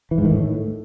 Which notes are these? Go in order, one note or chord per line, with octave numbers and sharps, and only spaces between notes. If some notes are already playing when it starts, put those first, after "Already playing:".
E3
G#2
D#3
A2